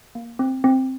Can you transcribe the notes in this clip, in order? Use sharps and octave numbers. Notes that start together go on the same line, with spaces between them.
A#3
C4
C4